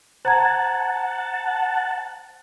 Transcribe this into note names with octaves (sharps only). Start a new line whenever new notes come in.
C5 F#5 A5 A#5 G#6